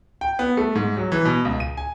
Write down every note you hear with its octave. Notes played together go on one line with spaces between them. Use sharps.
G5
B3
A3
G#2
F#3
E3
B2
C#2
D#7
G#5